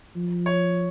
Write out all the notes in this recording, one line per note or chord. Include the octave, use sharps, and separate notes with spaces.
F3
C#5